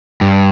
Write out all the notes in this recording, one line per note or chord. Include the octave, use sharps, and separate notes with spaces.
G2